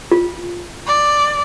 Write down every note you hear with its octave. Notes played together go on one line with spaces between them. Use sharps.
F4
D5